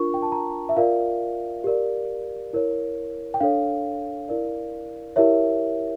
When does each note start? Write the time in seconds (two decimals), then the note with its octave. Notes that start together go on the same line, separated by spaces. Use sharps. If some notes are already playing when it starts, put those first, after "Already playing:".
Already playing: D4 F4 A#4 C#6
0.14 G5
0.22 A5
0.32 A#5
0.69 E5
0.77 F4 A#4 D5 F5
1.64 G4 A#4 D5
2.53 E4 A#4 C#5
3.34 G5
3.40 D4 A4 C#5 F5
4.29 E4 A#4 D5
5.16 E4 G4 A#4 C#5 E5